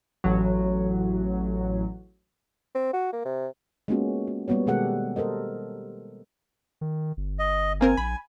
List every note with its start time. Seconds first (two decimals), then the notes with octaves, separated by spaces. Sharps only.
0.24 A1 F#3
2.75 C4
2.93 F#4
3.13 A#3
3.25 C3
3.88 G#3 A#3 B3 C#4 F4 F#4
4.27 F#4
4.48 G3 A#3 B3 F#4 C#5
4.66 B2 D#3 G#3 G4 A4 F#5
5.16 A4 A#4 C5 D#5
6.81 D#3
7.17 G1
7.39 D#5
7.81 A#3 C4 A#4 G#5
7.97 A#1 B5